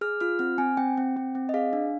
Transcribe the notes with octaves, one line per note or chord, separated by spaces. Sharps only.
G#4 F6
F4 F6
C4 F6
C4 G#5
C4 G5
C4
C4
C4
D#5
G#4 F5
D4